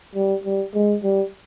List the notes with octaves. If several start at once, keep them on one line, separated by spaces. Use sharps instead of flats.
G3
G3
G#3
G3